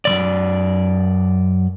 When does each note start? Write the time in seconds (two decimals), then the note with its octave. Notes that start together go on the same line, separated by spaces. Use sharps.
0.05 F#2 D#3 D5